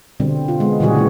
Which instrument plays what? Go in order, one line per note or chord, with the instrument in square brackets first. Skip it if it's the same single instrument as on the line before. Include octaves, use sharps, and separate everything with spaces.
[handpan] B2 D3 G3 C4
F4
G#3 B3
A#2 C#3 E3 G3 F#4 G#4
C#3 G#3